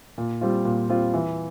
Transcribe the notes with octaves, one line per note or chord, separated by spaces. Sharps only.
A#2
G3 C4 F4
A#2
G3 C4 F4
E3